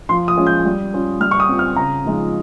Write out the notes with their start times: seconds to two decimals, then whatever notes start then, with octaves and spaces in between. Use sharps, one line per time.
0.09 F3 C6
0.28 D#6
0.37 G#3 C#4 F4
0.46 G6
0.65 G3
0.94 C#4 F4
1.20 G3 F6
1.31 C#6
1.40 D#6
1.49 C4 F4
1.59 F6
1.76 C#3 A#5
2.05 F3 G#3 D#4